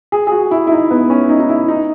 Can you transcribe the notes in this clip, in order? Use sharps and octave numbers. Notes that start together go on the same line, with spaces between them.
G#4
G#4
F#4
E4
E4
D#4
B3
C#4
D#4
D#4
E4
D#4